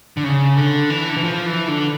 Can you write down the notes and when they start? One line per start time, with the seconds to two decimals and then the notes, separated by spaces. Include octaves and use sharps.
0.17 D3
0.24 C#3
0.57 D3
0.90 E3
1.10 D3
1.17 E3
1.24 F3
1.46 E3
1.68 D3